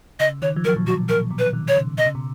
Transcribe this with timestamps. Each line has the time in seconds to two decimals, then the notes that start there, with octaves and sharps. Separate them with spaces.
0.20 C#3 D#5
0.42 D#3 C#5
0.56 F3
0.65 F#3 A#4
0.76 A#2
0.87 B2 F#4
1.09 A#2 A#4
1.31 B2
1.39 B4
1.53 D#3
1.68 C#5
1.75 C#3
1.98 B2 D#5
2.06 C#3
2.15 B2